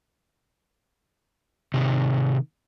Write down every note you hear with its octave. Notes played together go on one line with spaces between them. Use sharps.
C3 D#3 D#4